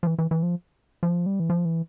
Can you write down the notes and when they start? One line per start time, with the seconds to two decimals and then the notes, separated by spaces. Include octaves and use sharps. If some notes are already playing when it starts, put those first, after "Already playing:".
0.03 F3
0.07 E3
0.18 E3
0.31 E3
0.43 F3
1.03 F3
1.26 G3
1.40 E3
1.50 F3
1.65 E3